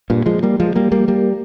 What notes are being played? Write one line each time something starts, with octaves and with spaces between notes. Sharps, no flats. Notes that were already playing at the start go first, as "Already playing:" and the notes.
G2 A#2
F3 G#3
G3 A#3
F3 G#3
G3 A#3
G3 A#3
G3 A#3